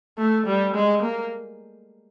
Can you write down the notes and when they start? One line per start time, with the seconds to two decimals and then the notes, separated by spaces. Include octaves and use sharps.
0.18 A3
0.46 G3
0.75 G#3
1.02 A#3